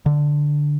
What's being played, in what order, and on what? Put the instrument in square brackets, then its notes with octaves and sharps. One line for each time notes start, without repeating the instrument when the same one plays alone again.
[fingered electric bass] D3